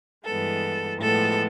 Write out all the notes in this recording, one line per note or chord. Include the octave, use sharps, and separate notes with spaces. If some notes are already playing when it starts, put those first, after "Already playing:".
G2 E3 G#3 B3 A4
A2 F3 G#3 B3 A4